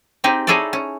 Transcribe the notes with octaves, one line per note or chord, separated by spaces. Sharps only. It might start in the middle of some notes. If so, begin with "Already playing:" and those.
C4 D#4 G4 G#4
D#4 E4 G#4 A4 C#5 D5
C#4